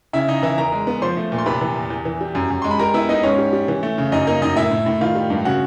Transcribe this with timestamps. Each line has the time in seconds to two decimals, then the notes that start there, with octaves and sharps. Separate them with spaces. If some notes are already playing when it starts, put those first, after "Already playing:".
0.13 C#3 E4 E5
0.28 C#3 D#4 D#5
0.43 E3 E4 E5
0.58 E2 A#4 A#5
0.72 G#3
0.87 B3
1.02 F3 C5 C6
1.17 A3
1.32 A#2
1.38 C6
1.46 C3 B4 B5
1.61 E3
1.76 E2
1.90 E2
2.05 E3
2.21 G3
2.35 F#2
2.50 F#2
2.62 G#3 C6
2.71 B5
2.79 G3 A#4 A#5
2.94 B3 E4 E5
3.09 B3 D#4 D#5
3.23 G#2 C#4 C#5
3.38 G3
3.53 G3
3.68 E3
3.83 A3
3.98 C#3
4.12 F#2 D#4 D#5
4.27 A#3 D#4 D#5
4.42 F#2 D#4 D#5
4.56 A2 E4 E5
4.71 A2
4.86 A2
5.01 D#3 F4 F5
5.15 G3
5.30 G2
5.45 C#3 F#4 F#5